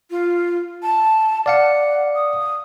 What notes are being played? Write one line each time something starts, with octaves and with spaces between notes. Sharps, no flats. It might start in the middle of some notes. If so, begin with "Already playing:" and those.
F4
A5
D5 F5 F#5 C#7
D#6